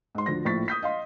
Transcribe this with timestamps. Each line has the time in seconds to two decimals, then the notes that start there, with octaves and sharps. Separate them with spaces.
0.15 G#2 C6
0.26 D2 F3 D4 A#6
0.45 A#1 A2 F3 C#6 A6 B6
0.68 D#6 G6 B6
0.82 D#5 F5 C6